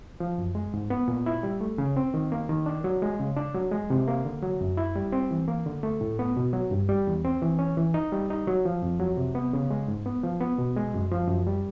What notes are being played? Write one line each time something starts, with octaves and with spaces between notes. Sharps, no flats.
F3
F#2
G#3
G#2
B3
A#2
E4
G3
A3
C#3
C4
D#3
A#3
D#3
D4
F#3
G#3
C#3
D4
F#3
G#3
C3
A#3
D3
F#3
F#2
E4
G3
C4
E3
A#3
D3
A3
A2
B3
B2
F#3
G2
G3
E2
C4
E3
C#4
E3
D#4
G3
D#4
F#3
F3
F2
F#3
C3
B3
C#3
G#3
G#2
B3
F3
B3
B2
G#3
F#2
F3
F#2
G3